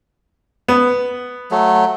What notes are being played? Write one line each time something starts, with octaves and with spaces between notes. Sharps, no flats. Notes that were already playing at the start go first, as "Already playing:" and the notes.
B3
F#3 A3